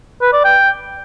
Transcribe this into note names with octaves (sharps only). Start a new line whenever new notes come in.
B4
D5
G5